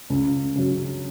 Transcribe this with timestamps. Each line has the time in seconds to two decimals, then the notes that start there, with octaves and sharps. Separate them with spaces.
0.10 C#2
0.55 C#3 F#3